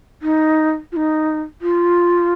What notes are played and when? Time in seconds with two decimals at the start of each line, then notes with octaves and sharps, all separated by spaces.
0.22 D#4
0.92 F4
0.96 D#4
1.62 F4